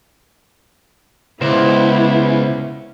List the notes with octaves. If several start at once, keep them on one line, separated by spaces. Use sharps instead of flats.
C#2 B3 E4 C5 D5